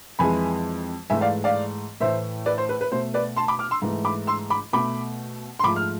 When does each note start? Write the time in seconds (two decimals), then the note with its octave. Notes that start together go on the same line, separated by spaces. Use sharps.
0.19 F2 E3 G#3 G#5 B5
1.10 G#2 E3 A3 E5 G#5
1.21 D5 F5
1.44 D5 F5
2.00 A2 E3 A3 C5 E5
2.46 B4 D5
2.58 C5
2.69 B4
2.81 B4
2.91 B2 A3 C5
3.14 B4 D5
3.36 A5 C6
3.48 B5 D6
3.59 D6 F6
3.71 C6 E6
3.82 G#2 E3 A3
4.05 B5 D6
4.27 C6 E6
4.50 B5 D6
4.73 B2 A3 B5 D6
5.59 C6
5.64 G#2 F3 A3 B5 D6
5.76 F6